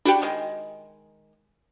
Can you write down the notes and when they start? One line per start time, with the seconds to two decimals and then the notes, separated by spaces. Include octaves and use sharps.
0.06 D4 F#4 G4 G5 B5
0.22 D#3 G#3